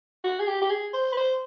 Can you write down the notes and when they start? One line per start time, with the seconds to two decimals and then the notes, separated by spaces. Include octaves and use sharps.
0.24 F#4
0.40 G#4
0.47 G4
0.62 G4
0.70 G#4
0.93 C5
1.12 B4
1.17 C5